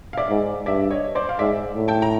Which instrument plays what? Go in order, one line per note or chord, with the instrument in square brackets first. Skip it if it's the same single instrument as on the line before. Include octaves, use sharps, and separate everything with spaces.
[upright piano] F5
D5 E5
[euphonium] G#2
[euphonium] G2 [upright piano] D5 E5
[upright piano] C#5 D#5
C5 D5
F5
[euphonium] G#2 [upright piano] D5 E5
[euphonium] A2
[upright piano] G5 A5
A#5